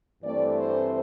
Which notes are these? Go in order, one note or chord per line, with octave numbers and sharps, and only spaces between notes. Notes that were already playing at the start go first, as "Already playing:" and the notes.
G2 E3 A3 C4 D5
C5